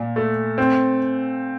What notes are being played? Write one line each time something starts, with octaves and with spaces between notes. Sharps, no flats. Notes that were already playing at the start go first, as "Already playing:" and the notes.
Already playing: A#2
A3
C4